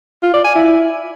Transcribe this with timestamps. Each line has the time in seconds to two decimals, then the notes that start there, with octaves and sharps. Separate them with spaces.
0.23 F4
0.34 D5
0.44 G#5
0.55 E4